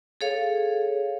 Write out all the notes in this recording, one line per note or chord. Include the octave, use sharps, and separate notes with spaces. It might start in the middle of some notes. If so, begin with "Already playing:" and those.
G#4 A4 C#5 F5